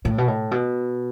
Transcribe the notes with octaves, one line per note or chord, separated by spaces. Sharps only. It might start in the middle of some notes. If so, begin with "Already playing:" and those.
A2
B2
A2
B2